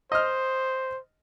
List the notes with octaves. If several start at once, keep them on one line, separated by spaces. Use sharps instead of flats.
C5 D#5 F6